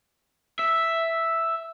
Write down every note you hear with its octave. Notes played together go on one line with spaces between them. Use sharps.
E5